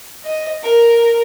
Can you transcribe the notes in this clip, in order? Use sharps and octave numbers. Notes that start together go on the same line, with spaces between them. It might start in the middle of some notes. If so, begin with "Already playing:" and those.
D#5
A#4